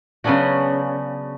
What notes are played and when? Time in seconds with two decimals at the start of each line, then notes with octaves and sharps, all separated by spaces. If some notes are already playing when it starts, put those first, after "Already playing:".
0.24 C#3 F#3 B3 C#4 D4 F#4